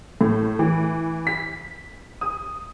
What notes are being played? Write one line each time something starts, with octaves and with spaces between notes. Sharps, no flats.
A2
E3
B6
D#6